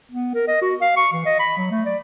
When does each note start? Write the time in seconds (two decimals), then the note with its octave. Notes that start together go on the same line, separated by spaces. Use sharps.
0.11 B3
0.34 A#4
0.48 D#5
0.62 F#4
0.81 F5
0.97 C#6
1.13 E3
1.26 D#5
1.40 B5
1.57 F#3
1.71 A3
1.85 D5